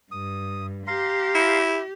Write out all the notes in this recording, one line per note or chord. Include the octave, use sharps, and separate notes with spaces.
G2 D#6
G4 F5 A#5 C6
E4